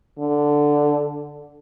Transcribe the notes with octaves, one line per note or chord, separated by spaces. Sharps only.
D3